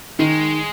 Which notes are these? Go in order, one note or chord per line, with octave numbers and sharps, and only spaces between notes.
D#3 G#3